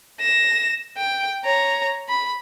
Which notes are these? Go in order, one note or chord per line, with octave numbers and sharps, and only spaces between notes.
A#6 E7
G5
C#5 A#5
B5